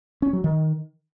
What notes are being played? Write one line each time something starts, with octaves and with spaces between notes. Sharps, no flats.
C#4
F#3
D#3